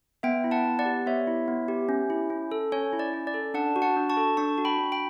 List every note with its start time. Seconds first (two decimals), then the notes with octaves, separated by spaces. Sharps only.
0.23 B3 E5 G5
0.44 E4
0.51 F#5 A5
0.65 B3
0.79 D5 F#5
0.85 G4
1.06 B3 C#5 E5
1.27 E4
1.48 B3
1.68 G4
1.89 C#4
2.10 E4
2.30 C#4
2.52 A4
2.72 C#4 C#5
2.93 E4
2.99 D5
3.13 C#4
3.27 D5
3.34 A4
3.54 D4 F#5 A5
3.76 F#4
3.82 F#5 A5
3.96 D4
4.10 A5 C#6
4.17 A4
4.37 D4 A5 C#6
4.58 F#4
4.65 G5 B5
4.78 D4
4.92 G5 B5